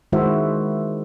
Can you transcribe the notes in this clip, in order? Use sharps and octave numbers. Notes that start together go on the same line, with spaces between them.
D#3 G#3 E4 F#4 C5 E5